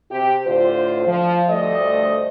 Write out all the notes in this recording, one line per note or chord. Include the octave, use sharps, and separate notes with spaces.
C3 G4
A2 D3 F4 C5
F3
D2 G2 A3 C5 D5 D#5